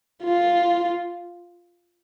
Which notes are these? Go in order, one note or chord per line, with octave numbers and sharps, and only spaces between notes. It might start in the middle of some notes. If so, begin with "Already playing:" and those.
F4